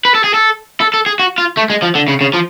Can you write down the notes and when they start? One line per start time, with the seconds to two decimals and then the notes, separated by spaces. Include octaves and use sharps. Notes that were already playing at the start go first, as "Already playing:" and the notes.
0.05 B4
0.15 A4
0.24 G#4
0.34 A4
0.81 A4
0.94 A4
1.06 G#4
1.19 F#4
1.38 F4
1.57 A3
1.70 G#3
1.82 F3
1.95 D3
2.08 C#3
2.21 C#3
2.34 F3